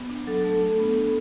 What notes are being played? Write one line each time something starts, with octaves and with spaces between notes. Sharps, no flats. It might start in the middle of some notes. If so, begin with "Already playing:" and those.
Already playing: B3
D4
F#3 A4
A3
D4
B3
B3